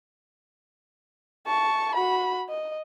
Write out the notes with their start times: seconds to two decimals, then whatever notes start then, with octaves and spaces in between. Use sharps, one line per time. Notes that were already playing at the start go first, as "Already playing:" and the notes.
1.47 A5 C#6
1.95 F#4 B5
2.50 D#5